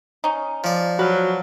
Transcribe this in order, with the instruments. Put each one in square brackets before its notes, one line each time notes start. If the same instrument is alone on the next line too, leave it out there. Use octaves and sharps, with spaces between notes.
[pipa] C#4 D#4
[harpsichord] F3 D5
[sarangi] F#3 [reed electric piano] F#4 F6 [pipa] B4